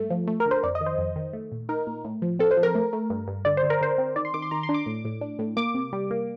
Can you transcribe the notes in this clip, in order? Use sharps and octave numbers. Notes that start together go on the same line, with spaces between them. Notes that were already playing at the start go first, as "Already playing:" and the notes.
Already playing: G2 A3
F3
A3
A#4
D3
C5
F2 D5
D#5
D#3
C5
F2
D#3
A3
A#2
D#4 A#4
A#2
A2
F3
C4 A4
C5
F3
A#4
A3
A3
G2
G2
D3 D5
C5
D3
A#4
D3 C5
C4
D#3 D5
C6
D#3 D6
C6
D#3 A#5
C6
D4
D6
A2
A2
D4
A2
A#3 D6
C3
G3
A#3